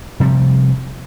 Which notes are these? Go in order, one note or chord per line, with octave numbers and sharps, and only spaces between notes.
C3 F3 G3